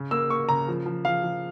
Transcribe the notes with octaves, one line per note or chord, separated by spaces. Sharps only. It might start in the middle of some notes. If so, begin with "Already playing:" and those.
Already playing: C#3
A#3 E6
A#3 C#6
C#3 A#5
F3
F3
F3 F5
F3